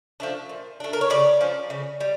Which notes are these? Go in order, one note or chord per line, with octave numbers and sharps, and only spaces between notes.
F3 A3 D4
A#2
A3 D4
A#4
C#5
C#3 D5
F3 C#4
C#3
G3